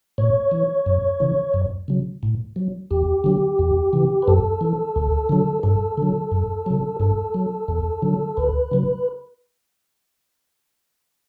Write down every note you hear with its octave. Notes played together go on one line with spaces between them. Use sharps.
A2 C#5
E3
F#2
C#3 E3
F#2
C#3 F#3
A2
F#3
E2 G4
D3 F#3
E2
C#3 E3
B4
F#2 A4
E3
D2
D3 F#3
G2 A4
D3 F#3
F#2
C#3 F#3
G2 A4
F#3
E2
D3 F#3
D2 B4
C#3 F#3